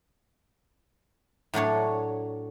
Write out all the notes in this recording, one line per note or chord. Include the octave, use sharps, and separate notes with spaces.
A2 F#3 D4 C#5